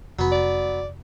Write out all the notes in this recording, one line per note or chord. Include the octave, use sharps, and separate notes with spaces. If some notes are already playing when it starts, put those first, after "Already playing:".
F1 F#3 B3
D5